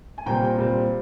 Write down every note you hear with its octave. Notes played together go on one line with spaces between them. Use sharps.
G#5
A#2 G3 C4 G5 A#5
A#2 G3 C4